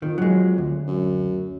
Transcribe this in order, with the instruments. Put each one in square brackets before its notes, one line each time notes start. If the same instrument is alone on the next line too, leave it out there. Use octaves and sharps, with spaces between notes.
[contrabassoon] F2 [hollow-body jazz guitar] D#3
[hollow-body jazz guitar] F#3 G#3
D2
[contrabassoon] F#2